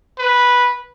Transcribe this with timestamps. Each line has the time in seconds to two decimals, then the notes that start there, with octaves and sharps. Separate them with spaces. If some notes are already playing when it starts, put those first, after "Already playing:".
0.19 B4